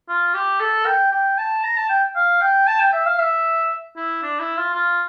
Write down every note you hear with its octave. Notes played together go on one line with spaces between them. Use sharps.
F4
G4
A4
G5
G5
A5
A#5
A5
G5
F5
G5
A5
G5
E5
F5
E5
E4
D4
E4
F4
F4